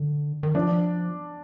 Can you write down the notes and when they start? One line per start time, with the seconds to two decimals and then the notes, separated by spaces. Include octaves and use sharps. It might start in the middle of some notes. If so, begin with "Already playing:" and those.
Already playing: D3
0.43 D#3
0.55 F3 D4